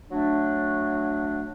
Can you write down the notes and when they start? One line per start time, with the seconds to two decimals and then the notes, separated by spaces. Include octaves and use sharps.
0.10 F#3 A3 D4